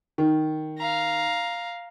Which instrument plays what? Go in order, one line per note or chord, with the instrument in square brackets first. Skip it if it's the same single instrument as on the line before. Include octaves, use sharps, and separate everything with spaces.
[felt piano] D#3
[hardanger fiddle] F5 A#5